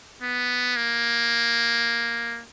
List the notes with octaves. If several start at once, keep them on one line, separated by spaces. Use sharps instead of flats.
B3
A#3